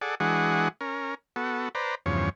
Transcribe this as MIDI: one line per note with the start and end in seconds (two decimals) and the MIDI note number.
0.01 0.15 68
0.01 0.15 69
0.01 0.15 74
0.01 0.15 78
0.20 0.68 52
0.20 0.68 56
0.20 0.68 62
0.20 0.68 66
0.20 0.68 68
0.20 0.68 78
0.81 1.15 61
0.81 1.15 70
1.36 1.69 59
1.36 1.69 66
1.36 1.69 69
1.75 1.95 71
1.75 1.95 72
1.75 1.95 74
1.75 1.95 82
2.06 2.29 40
2.06 2.29 43
2.06 2.29 49
2.06 2.29 53
2.06 2.29 73